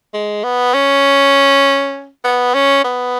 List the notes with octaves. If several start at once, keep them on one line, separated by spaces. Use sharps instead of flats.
G#3
B3
C#4
B3
C#4
B3